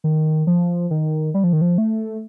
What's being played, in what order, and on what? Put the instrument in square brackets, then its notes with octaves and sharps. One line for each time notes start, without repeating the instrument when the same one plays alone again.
[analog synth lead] D#3
F3
D#3
G3
F3
D#3
F3
A3